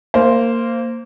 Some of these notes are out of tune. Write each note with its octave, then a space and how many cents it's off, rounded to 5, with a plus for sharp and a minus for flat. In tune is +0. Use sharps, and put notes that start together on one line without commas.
A#3 -15 C5 +0